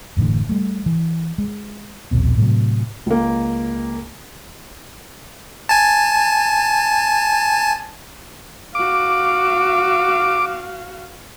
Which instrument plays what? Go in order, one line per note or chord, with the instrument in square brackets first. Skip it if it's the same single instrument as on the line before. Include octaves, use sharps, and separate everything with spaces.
[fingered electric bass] F#1 A2 D3 E3
G3 A3
E3
G#3
A#1 D#2 B2 C4
A2 C3 F#3
[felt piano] C#2 A#3
[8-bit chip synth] G#5 A5
[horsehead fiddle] F#4 F5 [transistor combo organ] D6